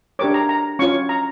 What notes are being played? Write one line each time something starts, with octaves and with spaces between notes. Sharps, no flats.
D4 G4 A#4 C#5 D6
A#5
A#5
C#4 F4 C#5 C#6
A#5